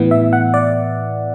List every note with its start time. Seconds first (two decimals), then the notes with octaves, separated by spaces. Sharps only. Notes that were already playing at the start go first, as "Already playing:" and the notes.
Already playing: A2 E3 B3
0.11 E5
0.33 F#5
0.54 D5